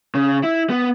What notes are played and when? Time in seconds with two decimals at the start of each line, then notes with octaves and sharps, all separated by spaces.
0.15 C#3
0.43 E4
0.70 B3